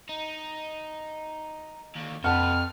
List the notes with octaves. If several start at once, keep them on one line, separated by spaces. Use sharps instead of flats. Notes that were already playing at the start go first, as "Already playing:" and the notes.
D#4
D#2 D3
F2 C3 B4 F#5 A5 F6